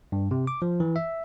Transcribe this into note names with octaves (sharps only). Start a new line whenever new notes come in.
G2
C3
D6
F3
E3
E5